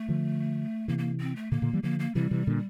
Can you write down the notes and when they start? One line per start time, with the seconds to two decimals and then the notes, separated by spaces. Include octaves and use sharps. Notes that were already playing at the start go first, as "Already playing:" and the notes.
Already playing: A3
0.09 D3 F3
0.88 C3 E3 A#3
0.99 A#3
1.21 C4
1.36 A3
1.51 A#2 D3 A#3
1.62 A#2 D3
1.73 E3 G3
1.83 D3 F3 A#3
1.99 A#3
2.15 C3 E3 G3
2.31 C3 E3
2.47 A#2 D3